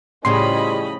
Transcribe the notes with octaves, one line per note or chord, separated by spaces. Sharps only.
A2 C#3 F3 G3 C#4 D#5 B5 C6